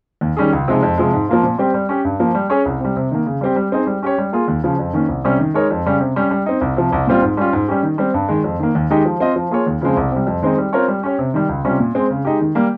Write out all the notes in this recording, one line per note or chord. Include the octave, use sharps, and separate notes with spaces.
D#2
D#3 G3 C#4 G#4
C#2
C3 F3 G#3 D#4
F2
C3 F3 G#3
G#2
F3 A#3 F4
A#2
G3 C4 G4
G3
C#4 G4
G2
F3 A#3
G3
C#4 G#4 C#5
C2
C3 G3
C3
D#3 A#3
C#3
G3 C4 G4
G3
C4 D#4 G#4 C5
G3
C#4 G4 C#5
G3
A#3 F4 G#4
D#2
C#3 F3
F2
D#3 A#3 C#4
C2
C3 G3 C#4
D#3
G#3 D#4 A#4 C#5
F2
C#3 G3 C#4
C3
G3 C#4
G3
C4 D#4
C2
C3 F3
C2
A#2 G3 C4 F4
G#2
G3 C#4 F4
G#2
G3 C#4 G4
D#3
G3 C4
G2
D#3 G#3
F2
D#3 A#3
D#2
D#3 G#3 D#4 G4
F3
C4 F4 C5 D#5
F3
A#3 F4 G#4 C#5
D#2
C#3 F3 G#3 C4
C2
C3 G3
F2
D#3 G#3 C4 D#4
G3
C4 F4 A#4 C#5
G3
C#4 G4 C#5
C3
D#3 G3
C#2
C3 G3 C#4 F4
A#2
G#3 C4
C#3
G#3 D#4 G4
D#3
G3 A#3